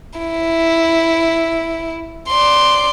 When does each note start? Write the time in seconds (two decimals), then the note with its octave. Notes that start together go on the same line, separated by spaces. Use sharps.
0.19 E4
2.29 D5 C6